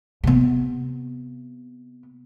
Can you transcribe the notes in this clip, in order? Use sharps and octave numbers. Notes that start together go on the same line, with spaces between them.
C3 B3